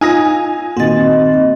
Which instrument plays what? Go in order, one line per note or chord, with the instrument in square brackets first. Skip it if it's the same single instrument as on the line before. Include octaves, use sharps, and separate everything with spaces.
[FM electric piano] D#4 F4 [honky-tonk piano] G#5 D#6 A#6
[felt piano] A#2 D#3 [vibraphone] C4 D#5 [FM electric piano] F#4 A6